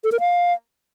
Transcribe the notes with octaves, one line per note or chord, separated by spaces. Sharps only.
A4
A#4
F5